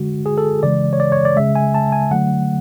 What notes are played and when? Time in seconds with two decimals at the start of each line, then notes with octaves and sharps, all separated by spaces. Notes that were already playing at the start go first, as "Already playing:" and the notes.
Already playing: D3 G#3 F#4
0.26 G#4
0.38 A4
0.63 C#3 E3 G#3 D5
0.93 C#5
1.00 D5
1.12 C#5
1.25 D5
1.36 C#3 G#3 E5
1.56 G#5
1.75 A5
1.92 G#5
2.11 D3 F#3 A3 F#5